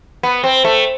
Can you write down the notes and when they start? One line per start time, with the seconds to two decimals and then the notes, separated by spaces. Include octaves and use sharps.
0.23 B3
0.44 C4
0.65 A3